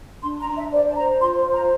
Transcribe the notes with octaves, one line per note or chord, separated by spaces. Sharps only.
D4 C6
A#5
D4
E5
C5 D5
A5
C5 A#5
F4 C6
C5
A#5